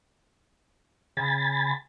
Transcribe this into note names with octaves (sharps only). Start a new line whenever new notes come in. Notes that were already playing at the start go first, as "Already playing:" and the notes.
C#3 G#5 B5 A6